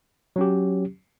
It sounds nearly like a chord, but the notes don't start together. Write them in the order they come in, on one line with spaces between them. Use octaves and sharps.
F#3 C#4 G4